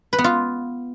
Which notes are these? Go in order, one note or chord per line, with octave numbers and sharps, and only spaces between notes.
B4
B3
F4